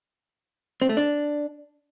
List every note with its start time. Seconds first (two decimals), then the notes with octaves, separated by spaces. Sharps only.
0.82 C4
0.89 A3
0.97 D4